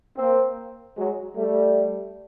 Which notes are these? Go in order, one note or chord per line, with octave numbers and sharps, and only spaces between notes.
A#3 C4
F#3 G#3
G3 A3